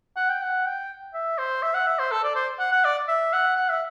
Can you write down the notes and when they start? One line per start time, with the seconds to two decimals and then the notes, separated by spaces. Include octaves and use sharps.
0.17 F#5
0.29 G5
0.42 F#5
0.66 G5
1.14 E5
1.38 C5
1.63 E5
1.74 F#5
1.87 E5
1.99 C5
2.11 A4
2.23 D5
2.35 C5
2.59 F#5
2.72 F#5
2.84 D5
3.08 E5
3.33 F#5
3.57 F#5
3.69 E5